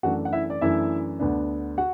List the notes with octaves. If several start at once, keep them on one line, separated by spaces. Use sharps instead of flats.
F#2 E3 A3 D4 F#4 F#5
F#5
E4 E5
D5
F#2 E3 A3 D4 E4 E5
D2 D3 B3 D4
F#4 F#5